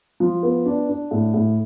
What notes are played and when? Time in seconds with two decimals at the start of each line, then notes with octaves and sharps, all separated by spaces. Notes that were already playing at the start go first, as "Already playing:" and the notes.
0.20 F3
0.43 B3
0.66 D4
0.89 D4
1.11 A2
1.34 A2